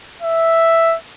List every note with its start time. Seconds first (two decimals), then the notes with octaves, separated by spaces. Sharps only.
0.22 E5